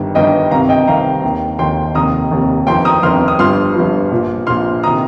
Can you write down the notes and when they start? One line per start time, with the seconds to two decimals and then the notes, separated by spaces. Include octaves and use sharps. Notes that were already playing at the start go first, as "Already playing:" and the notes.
Already playing: G1 G2 D#3
0.15 G1 G2 D#3 D#5 G5
0.51 C2 C3 D#3 F5 A#5
0.69 D#5 G5
0.87 C2 C3 D#3 F5 A#5
1.23 D#2 D#3
1.59 D#2 D#3 G5 C6
1.95 F1 D#2 D#3 A#5 D#6
2.31 F1 D#2 D#3
2.67 G1 F2 D#3 G5 C6
2.85 A#5 D#6
3.03 G1 F2 D#3 C6 F6
3.28 D#6
3.39 G1 G2 F3 C6 F6
3.75 G1 G2 F3
4.11 A#1 A#2 F3
4.47 A#1 A#2 F3 C6 F6
4.83 C3 D#3 A#5 D#6